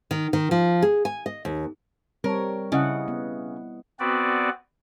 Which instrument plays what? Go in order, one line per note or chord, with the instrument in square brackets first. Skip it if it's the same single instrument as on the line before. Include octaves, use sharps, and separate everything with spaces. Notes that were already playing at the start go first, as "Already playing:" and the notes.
[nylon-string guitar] D#3
D#3
F3
G#4
G#5
D#5
D#2
[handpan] G3 C4 C#5 [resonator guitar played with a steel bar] A#4
[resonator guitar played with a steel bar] C#3 [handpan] E4 D#5 F#5
[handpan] B3
[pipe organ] B3 C4 F#4 B4 D5